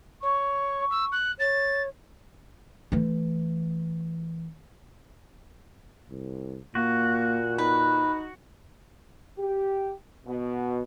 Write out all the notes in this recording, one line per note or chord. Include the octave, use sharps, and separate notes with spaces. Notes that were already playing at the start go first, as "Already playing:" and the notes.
C#5 C#6
E6
F#6
C#5 A6
E3 A3
C2
A#2 A#3 F#4
D#4 B4
G4
B2